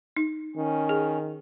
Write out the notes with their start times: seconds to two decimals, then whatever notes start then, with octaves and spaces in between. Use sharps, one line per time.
0.17 D#4
0.56 D#3 C#4
0.89 G#4